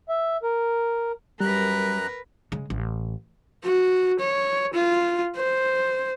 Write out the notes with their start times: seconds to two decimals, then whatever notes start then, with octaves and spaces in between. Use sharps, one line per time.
0.09 E5
0.43 A#4
1.40 F#2 G3 A#4 B4 A#5 F#6
2.52 C#3 G#3
2.70 A1
3.64 F#4
4.20 C#5
4.74 F4
5.36 C5